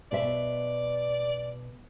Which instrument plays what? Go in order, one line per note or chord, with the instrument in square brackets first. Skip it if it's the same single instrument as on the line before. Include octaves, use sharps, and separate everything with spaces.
[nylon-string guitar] B2 C5 E5 [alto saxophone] D5